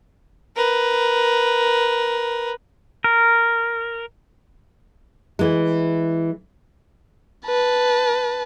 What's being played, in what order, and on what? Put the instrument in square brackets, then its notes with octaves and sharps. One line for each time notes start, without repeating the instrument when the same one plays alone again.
[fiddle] A#4 B4
[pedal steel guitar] A#4
[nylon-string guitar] E3 G#3
[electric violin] B4 A5